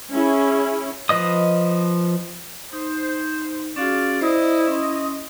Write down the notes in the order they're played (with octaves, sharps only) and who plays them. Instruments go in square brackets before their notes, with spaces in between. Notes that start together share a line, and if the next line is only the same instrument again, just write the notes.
[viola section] C#4 E4 G#4
[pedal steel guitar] F3 B4 D#5 D#6
[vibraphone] D#4 [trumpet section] C5
[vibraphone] C#4 F#4 G#4 [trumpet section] F4 D5 F5
[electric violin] E4 [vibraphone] C5 D5 [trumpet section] D#5
[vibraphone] C#4 C6